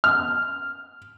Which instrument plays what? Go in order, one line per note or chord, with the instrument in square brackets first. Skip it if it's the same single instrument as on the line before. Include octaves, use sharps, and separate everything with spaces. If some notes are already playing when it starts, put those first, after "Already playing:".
[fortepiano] F6